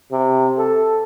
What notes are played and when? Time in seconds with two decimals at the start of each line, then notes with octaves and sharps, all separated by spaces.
0.12 C3
0.58 A4